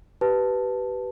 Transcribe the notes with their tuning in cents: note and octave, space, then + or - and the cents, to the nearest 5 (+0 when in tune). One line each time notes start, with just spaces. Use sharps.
G4 -25 B4 +0 A5 +0